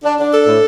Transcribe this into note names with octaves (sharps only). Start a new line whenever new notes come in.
D4
D4
A4
A2